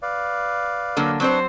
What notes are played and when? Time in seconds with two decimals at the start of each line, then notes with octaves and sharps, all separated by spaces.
0.02 B4 D5 F5
0.97 D3 F#3 A#3
1.20 F#3 C4 D4 B4 C5 C#6